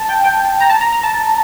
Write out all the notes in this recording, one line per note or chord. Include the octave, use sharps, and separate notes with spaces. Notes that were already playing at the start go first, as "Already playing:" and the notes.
Already playing: A5
G5
G5
A#5
A5
A#5
A#5
A5